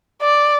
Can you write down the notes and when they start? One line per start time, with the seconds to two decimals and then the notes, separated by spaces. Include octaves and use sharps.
0.22 D5